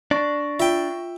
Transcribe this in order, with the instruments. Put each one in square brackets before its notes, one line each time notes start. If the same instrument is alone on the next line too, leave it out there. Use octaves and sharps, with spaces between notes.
[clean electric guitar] D4 [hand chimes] C#6 A#6
[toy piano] F4 [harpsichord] E5 G5